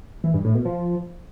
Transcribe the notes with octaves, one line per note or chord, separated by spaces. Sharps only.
E3
G2
A2
B2
F3